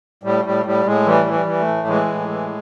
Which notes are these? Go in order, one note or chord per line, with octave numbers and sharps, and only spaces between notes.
A2 G3
A2 G3
A2 G3
A2 G#3
E3 G3
E3
G3
E3
A3
A2
E3 G#3
A2
E3